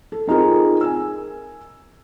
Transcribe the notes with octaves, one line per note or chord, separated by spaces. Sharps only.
A4
C4 D#4 F4 G#4 A#4
G#5 E6